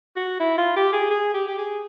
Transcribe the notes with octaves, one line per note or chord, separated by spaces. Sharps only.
F#4
E4
F4
G4
G#4
G#4
G4
G4
G#4